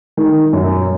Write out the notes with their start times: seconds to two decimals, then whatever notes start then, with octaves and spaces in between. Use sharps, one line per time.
0.17 D#3
0.53 F#2